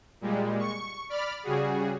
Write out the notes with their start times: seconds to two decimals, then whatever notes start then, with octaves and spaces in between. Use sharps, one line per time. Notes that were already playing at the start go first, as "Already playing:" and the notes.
0.21 A#2 G3 G#3
0.59 C#6
1.09 D5 B5 F6
1.43 C#3 G3 F#4 G#4